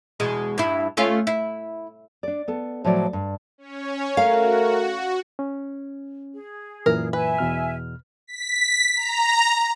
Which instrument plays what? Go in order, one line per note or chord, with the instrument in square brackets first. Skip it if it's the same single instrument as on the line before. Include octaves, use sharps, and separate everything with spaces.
[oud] E2 B2 G#3
G2 E4
A3 C#4 F4
E4
[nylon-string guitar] D4 D5
B3 A4
A2 F3 F#3 C#5 D5
G2
[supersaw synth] C#4 C#5
[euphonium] A3 [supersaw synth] F#4 [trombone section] A#4 [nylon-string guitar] F5
[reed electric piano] C#4
[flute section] G#4
[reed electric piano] F#2 A#2 E3 [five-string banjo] A#4
[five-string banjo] B4 [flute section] E5 G#5
[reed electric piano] E2 B2 F6
[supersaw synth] B6
A#5